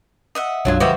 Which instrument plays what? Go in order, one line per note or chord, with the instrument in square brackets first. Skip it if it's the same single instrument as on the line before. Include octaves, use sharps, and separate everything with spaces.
[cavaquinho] D#5 E5 F#5
[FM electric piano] B1 F#2 G#6 [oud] F#3 D4 F4
[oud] D3 F3 F#4 [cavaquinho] G4 D#5 [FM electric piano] B4 E5